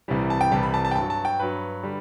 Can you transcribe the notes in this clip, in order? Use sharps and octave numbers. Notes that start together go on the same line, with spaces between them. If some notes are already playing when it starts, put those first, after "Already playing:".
C2 C3 E3 G3
A5
G5
C2 C3 E3 G3 A5
B5
A5
A5
G5
G2 F#3 A5
A5
G5
G2 F#3 B4
D3 G3